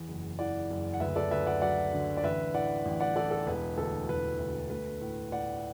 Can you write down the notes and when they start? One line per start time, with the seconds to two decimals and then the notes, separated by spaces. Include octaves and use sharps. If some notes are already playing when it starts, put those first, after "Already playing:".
Already playing: E2
0.08 F#1
0.39 E3 D5 F#5
0.70 F#1
0.93 F#5
1.00 D2 B4 E5
1.16 A4 D5
1.31 D2 B4 E5
1.47 D5 F#5
1.62 F#3 D5 F#5
1.93 D3
2.17 D5
2.24 A1 B4 E5
2.54 A2 D5 F#5
2.85 A1
3.00 D5 F#5
3.16 E3 A4 D5
3.31 A4
3.47 E1 B4
3.77 D2 A4
4.09 E1 B4
4.39 D2
4.69 A3 B4
5.01 A2
5.32 A2 D5 F#5